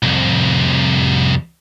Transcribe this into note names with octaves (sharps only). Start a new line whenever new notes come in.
C2 F2